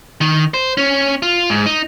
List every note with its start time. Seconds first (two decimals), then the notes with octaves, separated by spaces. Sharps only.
0.21 D#3
0.54 C5
0.77 C#4
1.22 F4
1.50 G#2
1.66 D#4